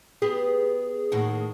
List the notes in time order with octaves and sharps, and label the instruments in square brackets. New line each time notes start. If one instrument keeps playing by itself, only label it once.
[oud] B3 G4 B4 [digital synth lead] G#4
[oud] D#2 A2 F#4